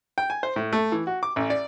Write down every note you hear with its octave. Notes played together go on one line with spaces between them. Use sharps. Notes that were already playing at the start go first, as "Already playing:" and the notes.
G5
G#5
C5
A2
A3
E3
F#4
D6
A1
D5